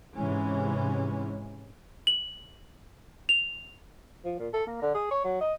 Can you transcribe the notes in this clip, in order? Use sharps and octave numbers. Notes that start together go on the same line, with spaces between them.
G#2 C3 E3 G#3 C#4
F#7
F7
F3
A#2
A4
A#3
D3
G#4
C#5
F#3
D#5